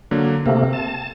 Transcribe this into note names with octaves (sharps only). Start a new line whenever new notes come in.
D3 F#3 A#3
C3 A3 A#3 C4
A5